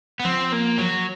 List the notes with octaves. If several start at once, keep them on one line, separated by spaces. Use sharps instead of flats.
B3
F3 C4
A#3
F#3